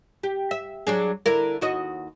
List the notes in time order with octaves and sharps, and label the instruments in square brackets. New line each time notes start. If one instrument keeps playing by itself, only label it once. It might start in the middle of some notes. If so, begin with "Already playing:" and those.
[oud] G4
E5
F#3 D4 G#4
D3 E4 A#4
D#2 F#4 D#5